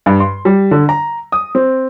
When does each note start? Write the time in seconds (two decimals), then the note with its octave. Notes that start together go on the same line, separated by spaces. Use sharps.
0.06 G2
0.20 C6
0.45 G3
0.71 D3
0.89 A#5
1.32 D#6
1.55 C4